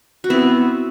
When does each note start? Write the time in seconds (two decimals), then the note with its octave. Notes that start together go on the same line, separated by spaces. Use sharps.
0.24 F#4
0.30 B3 C4 E4